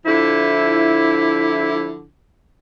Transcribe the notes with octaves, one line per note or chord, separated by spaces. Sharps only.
D3 F3 E4